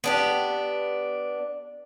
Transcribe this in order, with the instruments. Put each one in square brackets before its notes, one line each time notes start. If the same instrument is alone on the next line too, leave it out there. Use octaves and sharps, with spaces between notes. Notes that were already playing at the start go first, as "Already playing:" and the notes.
[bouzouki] B3 D4 G4